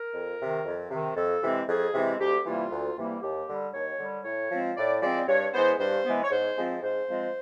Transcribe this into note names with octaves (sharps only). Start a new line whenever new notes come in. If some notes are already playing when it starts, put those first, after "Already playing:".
Already playing: A#4
F2
C3 D#3
F2
C3 D#3
F2 A4
C3 E3 G#3 C4
F2 G#4
C3 E3 G#3 C4
D2 G4
C3 E3 G3 A#3 F4
D2
C3 E3 G3 A#3
D#2 G4
D3 G3
D#2 C#5
D3 G3
A2 C#5
F3 G#3 C4
A2 D5
F3 G#3 C4 D5
G2 C#5
E3 G#3 B3 C5
G2 C5
E3 G#3 B3
C#5
G#2 C5
F3 G#3 C4
G#2 C5
F3 G#3 C4